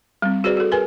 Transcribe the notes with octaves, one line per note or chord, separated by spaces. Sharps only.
G3 C4
F#4 G#4 B4 C5 D5
F#4 A4
G#4 A#4 B4 G#5